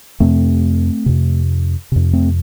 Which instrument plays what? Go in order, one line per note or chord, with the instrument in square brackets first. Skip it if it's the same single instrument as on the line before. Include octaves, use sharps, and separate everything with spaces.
[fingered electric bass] F2 C3 A3 C4
F2 C3
F2 C3
A3 C4